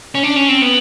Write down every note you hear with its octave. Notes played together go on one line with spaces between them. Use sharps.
C#4
D4
C#4
C4
B3